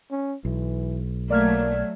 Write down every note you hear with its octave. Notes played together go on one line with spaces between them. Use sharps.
C#4
B1 E3
F#3 A3 A#3 D5 F6 G#6